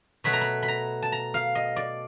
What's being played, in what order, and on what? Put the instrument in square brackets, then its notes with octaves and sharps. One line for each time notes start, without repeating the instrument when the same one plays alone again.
[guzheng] B2 F#3 A3 B5
A#5
B5
B5
A#5
A5
A#5
F5
D#5
D5